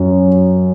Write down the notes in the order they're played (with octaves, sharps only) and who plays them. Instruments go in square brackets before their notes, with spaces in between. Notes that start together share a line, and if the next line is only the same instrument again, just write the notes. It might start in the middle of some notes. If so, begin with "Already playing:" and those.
Already playing: [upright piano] F#2